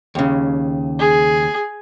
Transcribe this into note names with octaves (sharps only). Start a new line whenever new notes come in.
D#2 C#3
G#4